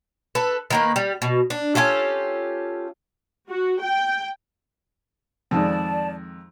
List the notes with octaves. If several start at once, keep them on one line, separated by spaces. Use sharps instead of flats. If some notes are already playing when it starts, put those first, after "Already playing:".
A4 B4
D#3 A#3 B4
G3
B2
D4
C#4 F4 G4 A4
F#4
G5
F2 D#3 G#3 D5 A5